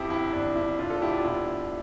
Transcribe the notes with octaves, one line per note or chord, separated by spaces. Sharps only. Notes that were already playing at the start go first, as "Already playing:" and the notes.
Already playing: F2 E4 G4
G1 E4
G1 D4
G1 E4
E1 D4 F4
F4 A4
D2 E4 G4
D4 F4
E1 E4
E1